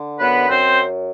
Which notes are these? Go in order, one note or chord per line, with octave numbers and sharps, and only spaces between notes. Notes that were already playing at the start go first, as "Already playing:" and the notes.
Already playing: D3
F#2 B3 B4
F#2 C4 C5